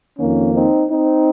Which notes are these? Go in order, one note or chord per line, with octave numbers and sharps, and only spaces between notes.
F2 D#3 A#3 C#4
C4 D#4
C4 D#4